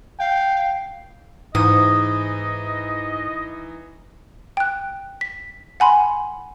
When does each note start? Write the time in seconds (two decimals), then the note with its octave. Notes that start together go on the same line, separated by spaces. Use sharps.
0.20 F5 G5
1.55 G#2 E3 D#4 D#5 D#6
4.57 G5 F#6
5.21 B6
5.80 F#5 G#5 B5 C6